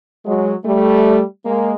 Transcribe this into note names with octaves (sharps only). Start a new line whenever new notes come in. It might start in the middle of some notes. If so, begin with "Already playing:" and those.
F#3 G#3
G3 A3
G#3 A#3